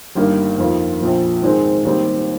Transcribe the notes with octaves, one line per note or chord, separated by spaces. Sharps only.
G1 G2 D#3 A#3 D4
F2 D#3 A#3 F4
A#1 A#2 F3
G#2 D#3 G#3 C4 D#4
D#2 D#3 G3 C4